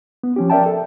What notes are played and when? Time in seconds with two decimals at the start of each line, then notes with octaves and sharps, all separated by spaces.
0.23 B3
0.36 F3 C#4 G4
0.50 A#4 D5 E5 G5 A5
0.66 A4